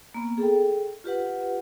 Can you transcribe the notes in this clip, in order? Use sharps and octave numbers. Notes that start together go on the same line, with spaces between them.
A#3 B3
G#4 A4 G5
F4 G4 B4 F#5